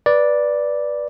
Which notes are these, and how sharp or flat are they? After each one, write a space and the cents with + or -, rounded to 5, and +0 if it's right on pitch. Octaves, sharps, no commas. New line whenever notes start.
B4 -15 D5 +0